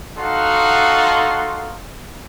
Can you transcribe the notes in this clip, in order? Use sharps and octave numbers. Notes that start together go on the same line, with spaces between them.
D#4 F#4 A4 F5 F#5 C6